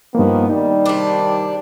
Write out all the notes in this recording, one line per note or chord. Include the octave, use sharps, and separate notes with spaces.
G2 D#3 F3 A#3 B3
D#3 G3 D#4
C3 D4